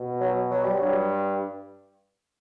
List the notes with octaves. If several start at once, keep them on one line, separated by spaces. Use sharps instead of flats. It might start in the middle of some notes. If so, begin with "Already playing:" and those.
Already playing: B2
F#3
F#3
G3
G2 F#3